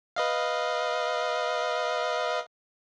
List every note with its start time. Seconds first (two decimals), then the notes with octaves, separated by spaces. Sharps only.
0.16 B4 D#5 F5